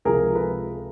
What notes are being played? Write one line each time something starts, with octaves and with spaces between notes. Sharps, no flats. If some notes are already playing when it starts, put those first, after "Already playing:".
C#2 C3 F3 G#4 A#4
A4 B4